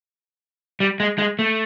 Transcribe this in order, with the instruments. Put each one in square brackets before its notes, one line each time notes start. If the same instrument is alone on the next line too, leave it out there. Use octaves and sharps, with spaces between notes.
[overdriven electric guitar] G3
G#3
G#3
A3